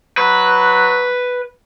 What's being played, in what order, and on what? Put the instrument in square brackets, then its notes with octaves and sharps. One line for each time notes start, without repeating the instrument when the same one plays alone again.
[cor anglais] F#3 [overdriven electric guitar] B4